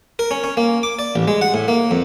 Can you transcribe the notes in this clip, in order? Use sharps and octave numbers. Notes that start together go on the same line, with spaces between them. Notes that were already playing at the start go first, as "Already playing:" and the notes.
A#4
C#4
C#4
A#3
D6
D5
A1
G#3
F#5
A2
A#3
F2